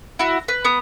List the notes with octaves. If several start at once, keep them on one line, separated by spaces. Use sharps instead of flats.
E4 F#4
B4
B3 D#6